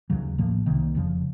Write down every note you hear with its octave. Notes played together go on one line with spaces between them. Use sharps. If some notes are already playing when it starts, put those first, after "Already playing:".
D#2 C#3 F#3
A1 A2 F3 A#3
C2 C3 D#3 A#3
F1 F2 C#3 F3